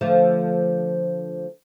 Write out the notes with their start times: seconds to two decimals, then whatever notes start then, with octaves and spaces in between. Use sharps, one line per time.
0.01 D3 F3 A3